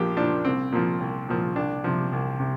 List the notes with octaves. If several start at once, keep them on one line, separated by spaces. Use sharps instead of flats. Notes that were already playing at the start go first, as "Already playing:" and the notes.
Already playing: A#1 F3 G4
A#2 F3 D4
C2 C4
A#2 F3
C2
A#2 F3
C2 D4
C3 F3
C2
C3